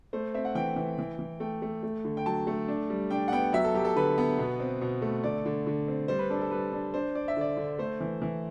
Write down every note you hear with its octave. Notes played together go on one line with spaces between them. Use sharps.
A3 C5
C4 E5
F#5
E3 G5
E3
E3
E3
A3 G5
A3
A3
D3
G5
F#3 A5
A3
D4
G3
D4 G5
F#5
B3 G5
F#3 E5
A4
F#3 G4
A4
D3 B4
B3
B2
C4
B2
A3
D3 D5
D3
D3
C4
G3 C5
B4
D4 A4
A4
G3 B4
D4
D4 C5
D4 D5
E5
D3 D5
D3
A3 C5
E3
E3